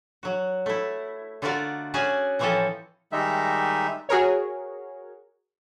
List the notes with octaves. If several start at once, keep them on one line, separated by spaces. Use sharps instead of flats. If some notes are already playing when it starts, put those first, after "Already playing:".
F#3 F#4
A3 E4
D3 A3 F4 F#4 A#4 D5
C#4 F#4 G#4 D5 G#5
A2 E3 F3 C4 C#4 A4
D#3 G3 G#3 D#4 E5
F#4 G#4 A#4 C#5